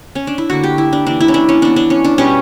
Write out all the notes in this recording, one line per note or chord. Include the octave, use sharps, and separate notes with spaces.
C#4
D4
E4
D3 A#3 F#4
G4
E4
D4
E3 A#3 D4
E4
C#4
D4
C#4
E3 B3 D4
D4
C#4
D4
B2 G3 B3 C#4